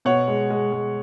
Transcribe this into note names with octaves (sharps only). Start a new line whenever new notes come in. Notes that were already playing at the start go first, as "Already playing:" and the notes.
B2 C#5 F#5
G#3
G#3
G#3